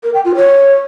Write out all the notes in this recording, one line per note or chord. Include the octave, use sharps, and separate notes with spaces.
A#4
G5
F4
C#5